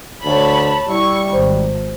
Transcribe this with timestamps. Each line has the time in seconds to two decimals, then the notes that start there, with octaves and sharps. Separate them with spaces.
0.24 D2 C#5 A5 B5
0.87 G3 E4 C#6
1.33 G#1 C5